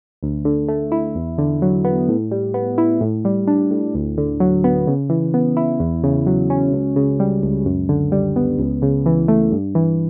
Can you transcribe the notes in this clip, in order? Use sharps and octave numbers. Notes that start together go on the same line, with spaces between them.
D2
D3
A3
E4
E2
D3
F#3
B3
A2
G3
B3
E4
A2
G3
D4
A2
D2
D3
F#3
B3
C#3
E3
B3
E4
E2
C#3
F#3
C#4
C#2
C#3
G3
C#2
F#2
D3
G3
B3
C#2
C#3
E3
A3
G2
E3